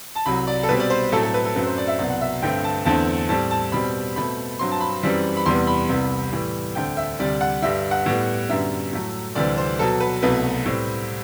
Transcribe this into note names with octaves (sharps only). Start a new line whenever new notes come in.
A5
C2 C3 F#3 B5
D5
A4
B2 G3 C4 B4
D5
C5
A2 F#3 A3 C4 A4
A4
B4
A4
F#2 F#3 A3 C4 B4
C5
D5
E5
C2 B2 F#3 B3 D5
F#5
E5
G2 D3 A3 C4 G5
A5
E2 D3 A3 C4 A5
A2 G3 C4 A5
A5
B2 G3 C4 B5
B2 A3 C4 B5
G2 F#3 C4 C6
A5
B5
F#2 E3 G3 C4
B5
E2 C3 G3 B3 C6
B5
C2 C3 G3 B3
A2 E3 G3
D2 D3 A3 C4 G5
E5
D2 C3 G3 D5
F#5
G2 D3 G3 E5
F#5
A2 G3 B3
F#2 D3 G3 B3 E5
A2 F#3 A3
D2 C3 E3 G3 C4 D5
C5
B2 F#3 B3 A4
B4
C2 B2 F#3 A3 B4
A2 G3 C4